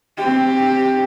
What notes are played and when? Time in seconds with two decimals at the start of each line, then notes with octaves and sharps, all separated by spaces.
0.17 C4 G4